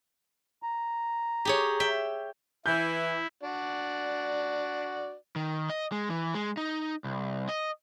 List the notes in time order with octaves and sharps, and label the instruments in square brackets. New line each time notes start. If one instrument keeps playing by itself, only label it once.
[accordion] A#5
[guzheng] G4 G#4 C#5
E5 G5
[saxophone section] E3 [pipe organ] E4 [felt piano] G6
[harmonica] D4 F#4 D5
[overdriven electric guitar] D#3
D#5
G#3
E3
G#3
D#4
C2
D#5